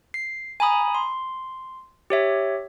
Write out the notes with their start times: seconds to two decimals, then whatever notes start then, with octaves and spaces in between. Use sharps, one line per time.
0.14 C7
0.60 G#5 A#5 B5 D#6
0.95 C6
2.10 G4 C#5 E5